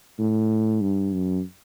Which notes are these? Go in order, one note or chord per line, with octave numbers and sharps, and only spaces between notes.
A2
G2
F#2